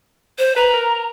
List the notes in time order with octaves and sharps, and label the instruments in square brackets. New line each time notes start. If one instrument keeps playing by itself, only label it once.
[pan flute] C5
[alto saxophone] B4 [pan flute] A#5
[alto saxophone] A#4